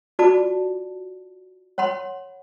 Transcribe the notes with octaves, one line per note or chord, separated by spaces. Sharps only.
F4 F#4 D5 A5 B5 D6
C#5 F#5 B5 C6